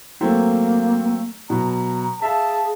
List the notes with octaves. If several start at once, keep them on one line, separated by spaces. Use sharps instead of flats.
F#3 A3 A#3 C4
B2 F#3 A#5
G#4 E5 F5 A5